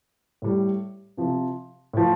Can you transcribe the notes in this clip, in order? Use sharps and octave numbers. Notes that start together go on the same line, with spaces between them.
A2 G3
C3 F3
A2 F3